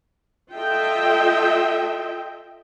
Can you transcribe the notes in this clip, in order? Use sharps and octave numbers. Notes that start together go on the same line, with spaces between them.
F4 A4 D#5 E5 G5